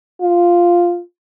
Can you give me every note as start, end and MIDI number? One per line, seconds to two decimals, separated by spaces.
0.21 1.00 65